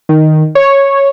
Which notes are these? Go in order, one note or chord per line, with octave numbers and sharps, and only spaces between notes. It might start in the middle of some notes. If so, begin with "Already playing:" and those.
D#3
C#5